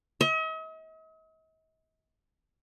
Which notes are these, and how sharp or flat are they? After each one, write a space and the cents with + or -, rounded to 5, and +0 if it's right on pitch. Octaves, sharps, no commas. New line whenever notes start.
D#5 +45